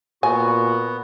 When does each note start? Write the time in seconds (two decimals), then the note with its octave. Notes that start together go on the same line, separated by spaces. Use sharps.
0.23 A#2 B3 F#4 G#5